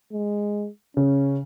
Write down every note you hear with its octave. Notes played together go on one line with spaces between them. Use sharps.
G#3
C#3 C#4